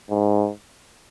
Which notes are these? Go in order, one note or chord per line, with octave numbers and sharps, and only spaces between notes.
G#2